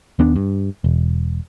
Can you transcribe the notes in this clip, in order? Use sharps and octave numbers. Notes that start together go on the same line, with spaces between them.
D#2 B3 D4
G2
E1